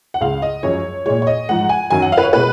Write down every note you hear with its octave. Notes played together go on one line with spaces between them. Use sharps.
F#5
C#2 C#3 G#3 F5
D#5
F#2 F3 G#3 C#5
A#2 G#3 C#5
C#5
D#5
G#2 F3 G#3 F#5
G#5
F#2 D#3 F#3 G#5
F#5
F5
B4
C#5
B2 G#3 B4